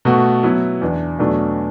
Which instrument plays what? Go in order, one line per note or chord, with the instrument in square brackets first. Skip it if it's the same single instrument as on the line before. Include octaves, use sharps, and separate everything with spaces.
[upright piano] B2 A3 F#4
F#3 B3 E4 B4
E2 E3 D4
E2 B2 F#3 A3 D4